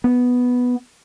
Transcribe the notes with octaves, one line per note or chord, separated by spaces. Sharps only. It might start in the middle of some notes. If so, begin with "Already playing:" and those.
B3